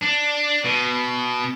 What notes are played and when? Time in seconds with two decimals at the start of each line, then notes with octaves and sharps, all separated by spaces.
0.01 D4
0.65 B2